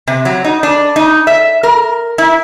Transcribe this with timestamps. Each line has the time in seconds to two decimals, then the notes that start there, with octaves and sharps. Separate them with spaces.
0.07 C3
0.25 F#3
0.44 D#4
0.63 D4
0.96 D#4
1.27 E5
1.63 A#4
2.18 E4